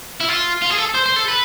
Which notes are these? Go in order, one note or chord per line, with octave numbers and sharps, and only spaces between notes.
E4
F4
F4
G#4
A4
C5
C5
A4
B4